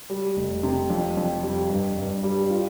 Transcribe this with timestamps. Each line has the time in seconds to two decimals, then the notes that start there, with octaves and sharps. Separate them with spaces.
0.10 G3
0.36 F1
0.63 C3
0.90 F2
1.17 F2
1.43 G3
1.70 G2
1.97 G2
2.23 G3
2.50 F4